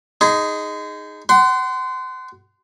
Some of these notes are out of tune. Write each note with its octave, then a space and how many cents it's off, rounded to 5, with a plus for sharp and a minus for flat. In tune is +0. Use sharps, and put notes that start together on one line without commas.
D#4 +0 G#4 +0 C6 -35
F#5 +30 C6 -20